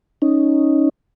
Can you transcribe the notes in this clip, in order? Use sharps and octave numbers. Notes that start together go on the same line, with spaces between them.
C#4 D#4